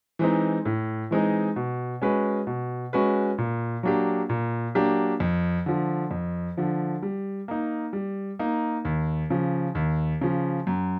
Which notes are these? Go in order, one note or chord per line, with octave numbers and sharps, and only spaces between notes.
E3 G#3 C4 D#4
A2
E3 G#3 C4 D#4
B2
G#3 C#4 F#4 B4
B2
G#3 C#4 F#4 B4
A#2
F#3 A#3 D4 G4
A#2
F#3 A#3 D4 G4
F2
D3 F3
F2
D3 F3
G3
A#3 D#4
G3
A#3 D#4
D#2
C#3 F3
D#2
C#3 F3
F#2